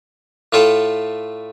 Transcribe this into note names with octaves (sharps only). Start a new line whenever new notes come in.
A2 A3 F4 A4